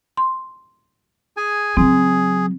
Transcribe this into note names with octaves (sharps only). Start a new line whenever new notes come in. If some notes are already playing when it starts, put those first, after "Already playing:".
C6
G#4 G#5
C#3 F#3 C4 G#4